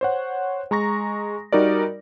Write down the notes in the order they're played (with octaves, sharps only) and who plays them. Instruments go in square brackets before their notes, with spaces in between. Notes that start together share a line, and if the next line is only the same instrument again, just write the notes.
[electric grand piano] C5 C#5 F#5
G#3 A#5 C#6 A#6
G3 D#4 F#4 A#4 D5